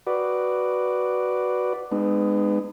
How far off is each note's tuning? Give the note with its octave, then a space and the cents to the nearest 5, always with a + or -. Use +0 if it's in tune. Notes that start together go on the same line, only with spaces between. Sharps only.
F#4 +10 B4 +0 D5 +0
G#3 +0 B3 +25 D#4 -40